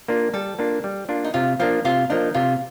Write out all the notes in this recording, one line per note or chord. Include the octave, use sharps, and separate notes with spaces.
A#3 D4 F4
G3 A4
A#3 D4 F4
G3
A#3 D4 F4
D#4
C3 F4
F3 A#3 D4 F4
C3 F4
F3 A#3 D4 D#4
C3 F4